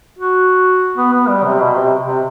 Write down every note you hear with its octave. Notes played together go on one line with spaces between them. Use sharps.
F#4
B3
B3
G3
C3
B2
C3
C3